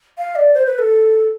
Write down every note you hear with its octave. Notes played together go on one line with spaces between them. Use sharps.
F5
D5
C5
B4
A4